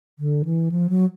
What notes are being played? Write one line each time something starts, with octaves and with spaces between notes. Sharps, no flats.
D3
E3
F3
F#3